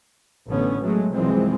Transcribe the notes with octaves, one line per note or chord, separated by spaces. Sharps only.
A1 D3 A3 B3 C#4
F#3 G#3 A3
C2 F#2 E3 F3 G#3 C4